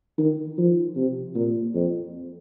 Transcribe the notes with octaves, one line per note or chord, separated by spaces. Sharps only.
D#3
F3
C3
A#2
F2